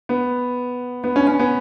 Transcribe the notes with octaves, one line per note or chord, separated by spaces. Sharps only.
B3
B3
C#4
C#4
B3